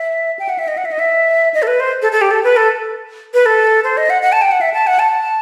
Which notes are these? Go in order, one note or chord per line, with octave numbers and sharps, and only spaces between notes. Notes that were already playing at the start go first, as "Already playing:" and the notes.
Already playing: E5
G5
F#5
E5
D#5
F#5
E5
D#5
E5
D#5
A4
B4
C5
A4
A4
G4
A4
B4
A4
B4
A4
C5
D#5
F#5
F#5
A5
G5
F#5
E5
A5
F#5
A5